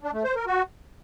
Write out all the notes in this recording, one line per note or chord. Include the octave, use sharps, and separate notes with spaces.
D4
A3
C5
A#4
F#4